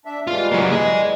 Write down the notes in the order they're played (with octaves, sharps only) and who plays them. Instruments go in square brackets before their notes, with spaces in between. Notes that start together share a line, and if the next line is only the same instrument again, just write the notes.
[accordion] D4 E5
[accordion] E3 G3 G#3 [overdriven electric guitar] F4
[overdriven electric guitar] F#3 A#3
G#4 D#5